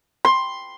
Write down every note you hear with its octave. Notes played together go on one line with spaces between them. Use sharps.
C6